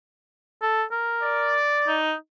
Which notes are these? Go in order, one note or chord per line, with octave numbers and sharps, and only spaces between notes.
A4
A#4
D5
D#4